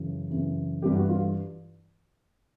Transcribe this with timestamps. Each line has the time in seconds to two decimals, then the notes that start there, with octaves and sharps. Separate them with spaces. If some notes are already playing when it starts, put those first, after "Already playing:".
Already playing: F#2 C#3 E3
0.31 F#2 C#3 E3
0.82 G2 E3 G4
0.96 F#4
1.09 F4